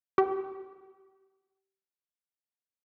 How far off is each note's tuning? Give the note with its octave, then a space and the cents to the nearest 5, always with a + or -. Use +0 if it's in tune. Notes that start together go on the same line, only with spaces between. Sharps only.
G4 -20